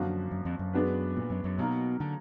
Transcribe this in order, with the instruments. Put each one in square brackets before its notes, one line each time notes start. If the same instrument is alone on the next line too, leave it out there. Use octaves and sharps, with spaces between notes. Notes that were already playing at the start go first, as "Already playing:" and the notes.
Already playing: [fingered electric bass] F#2 [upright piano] D3 F3 A#3 D4 F#4
[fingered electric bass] F#2
F2
F#2
[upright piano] G#3 B3 D4 F#4 B4
[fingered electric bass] A#2
F#2
F#2
[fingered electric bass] B2 [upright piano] F#3 A#3 D#4 A#4
[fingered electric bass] D3